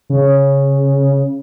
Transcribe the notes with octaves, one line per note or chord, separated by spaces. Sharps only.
C#3